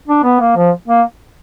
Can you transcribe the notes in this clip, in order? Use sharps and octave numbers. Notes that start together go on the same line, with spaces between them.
D4
B3
A#3
F3
A#3